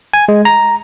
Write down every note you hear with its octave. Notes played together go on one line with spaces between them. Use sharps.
G#5
G#3
A#5